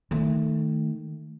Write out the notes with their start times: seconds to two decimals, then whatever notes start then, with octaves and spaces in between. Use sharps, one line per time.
0.11 D#3 A3